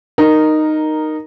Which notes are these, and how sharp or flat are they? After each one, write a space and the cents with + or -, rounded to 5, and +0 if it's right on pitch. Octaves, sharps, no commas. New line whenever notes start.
D#4 -10 A#4 +0